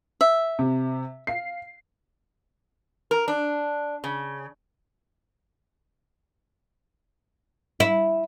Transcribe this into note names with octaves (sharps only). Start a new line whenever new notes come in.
E5
C3
F5 C7
A#4
D4
C#3
E4